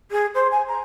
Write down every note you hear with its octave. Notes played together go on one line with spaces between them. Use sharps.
G#4
C5
G#5
A#5